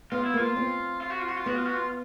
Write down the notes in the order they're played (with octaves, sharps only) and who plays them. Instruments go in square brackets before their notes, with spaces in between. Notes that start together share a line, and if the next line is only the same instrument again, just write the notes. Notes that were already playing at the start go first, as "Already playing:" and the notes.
[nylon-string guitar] B3 [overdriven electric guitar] F4
[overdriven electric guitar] E4
[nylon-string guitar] A#3 [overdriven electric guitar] F4
[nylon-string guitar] C4
[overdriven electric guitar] F4
F#4
F4
F#4
F4
[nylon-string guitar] B3 [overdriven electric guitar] F#4
[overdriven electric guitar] F4
F#4
F4